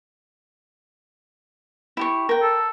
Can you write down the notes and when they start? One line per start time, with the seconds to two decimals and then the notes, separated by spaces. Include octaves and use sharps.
1.97 E4 G4 C#6
2.29 A#4 G5
2.42 A4